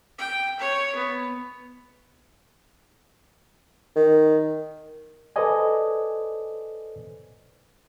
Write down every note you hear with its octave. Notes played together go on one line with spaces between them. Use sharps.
G5
C#5
B3
D#3
A4 B4 C5 D5 D#5 G#5